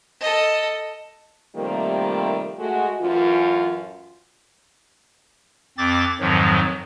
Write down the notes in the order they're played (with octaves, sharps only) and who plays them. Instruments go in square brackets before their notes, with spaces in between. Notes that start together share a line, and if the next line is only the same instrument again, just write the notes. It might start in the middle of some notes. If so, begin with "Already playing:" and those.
[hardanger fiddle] A4 D#5
[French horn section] C3 D#3 F3 G3 A3 A#3
G#3 A3 F#4
F#2 A2 E3 F4
[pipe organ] F2 C4 D6 A6
F2 G#2 D#3 F3 F#3